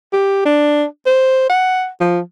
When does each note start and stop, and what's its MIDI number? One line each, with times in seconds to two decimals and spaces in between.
0.13 0.44 67
0.45 0.85 62
1.06 1.48 72
1.50 1.88 78
2.01 2.20 53